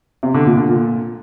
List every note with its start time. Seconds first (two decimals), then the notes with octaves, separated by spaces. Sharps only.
0.23 C3
0.34 D3
0.46 A#2
0.57 D3
0.69 A#2